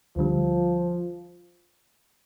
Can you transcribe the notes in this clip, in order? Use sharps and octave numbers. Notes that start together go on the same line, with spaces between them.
D2 D3 F3 G3